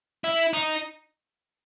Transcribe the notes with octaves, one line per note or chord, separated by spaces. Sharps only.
E4
D#4